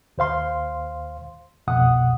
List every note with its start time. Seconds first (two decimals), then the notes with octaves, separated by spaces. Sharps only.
0.18 D#2 C5 F5 C6
1.67 C2 F2 B2 F#5 D#6